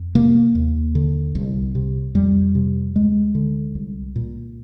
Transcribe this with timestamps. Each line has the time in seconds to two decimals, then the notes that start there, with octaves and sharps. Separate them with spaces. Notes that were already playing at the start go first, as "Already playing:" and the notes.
Already playing: F2
0.15 C3 A#3
0.55 D#2
0.95 D3
1.35 C2
1.75 C3
2.15 F2 G3
2.55 C3
2.95 D2 G#3
3.35 D3
3.75 C2
4.16 A#2